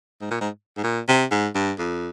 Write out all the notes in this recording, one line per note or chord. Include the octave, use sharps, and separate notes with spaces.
G#2
A#2
G#2
G#2
A#2
C3
G#2
G2
F2